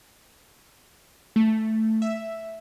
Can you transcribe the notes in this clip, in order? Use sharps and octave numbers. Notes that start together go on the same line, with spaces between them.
A3
E5